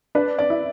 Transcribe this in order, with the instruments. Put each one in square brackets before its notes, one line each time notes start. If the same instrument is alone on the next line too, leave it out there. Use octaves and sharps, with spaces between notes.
[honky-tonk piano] D4 [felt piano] B4
[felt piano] D5
[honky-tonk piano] E4